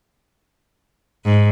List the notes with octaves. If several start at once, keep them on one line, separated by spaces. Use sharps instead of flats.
G#2